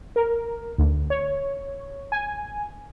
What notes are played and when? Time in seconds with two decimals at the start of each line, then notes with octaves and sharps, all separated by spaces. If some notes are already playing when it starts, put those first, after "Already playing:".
0.16 A#4
0.78 D2
1.10 C#5
2.12 G#5